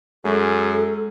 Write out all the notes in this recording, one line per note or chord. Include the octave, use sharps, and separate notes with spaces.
F#2 G#3 G#4 A4